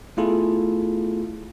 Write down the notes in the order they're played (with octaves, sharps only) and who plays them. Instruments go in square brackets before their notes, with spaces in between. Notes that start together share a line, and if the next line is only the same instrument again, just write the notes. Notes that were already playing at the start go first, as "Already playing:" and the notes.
[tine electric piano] A3 B3 E4 F4 G#4 A4